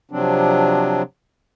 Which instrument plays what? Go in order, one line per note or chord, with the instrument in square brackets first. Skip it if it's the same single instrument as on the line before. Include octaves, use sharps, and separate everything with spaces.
[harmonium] C3 F3 F#3 C4 D4